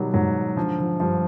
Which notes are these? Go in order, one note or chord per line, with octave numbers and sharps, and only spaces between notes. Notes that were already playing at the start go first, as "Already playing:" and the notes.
Already playing: B2 D#3 F#3 G3
G#2 F#3
D3 F3
F3
G2 F3